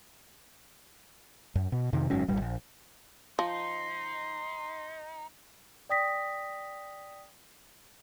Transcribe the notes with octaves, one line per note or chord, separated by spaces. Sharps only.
F#2
B2
F2 C3 D#3
F#1 G#2 F#3 C#4
D#1 G#1 G3
A#1
F3 D#4 C6
D5 G5 D#6 A#6 B6